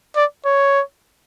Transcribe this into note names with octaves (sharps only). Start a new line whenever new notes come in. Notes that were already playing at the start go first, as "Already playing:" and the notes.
D5
C#5